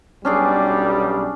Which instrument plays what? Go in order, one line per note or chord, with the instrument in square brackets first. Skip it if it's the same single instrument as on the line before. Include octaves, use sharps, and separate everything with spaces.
[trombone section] B1 G3 [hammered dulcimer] C#4 D4 G#4